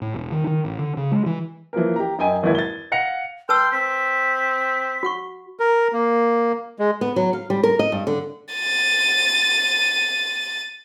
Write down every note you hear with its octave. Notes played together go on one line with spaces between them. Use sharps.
A2
E1
D#3
D#3
A1
D3
C#3
G#3
E3
E3 F3 A#3 A#4
G4 A#5
F#2 D#5 G5 G#5 D#7
G#1 D#2 E3 E4 B4 G#6
A6 G7
F5 F#5 A#6 C#7 F7
B4 G5 A5 C6 E6
C4 B6
F#4 F#5 C#6
A#4
A#3
G#3
B3
F#3
F5
G3
A#4
D#5
G2
D3
A6 D#7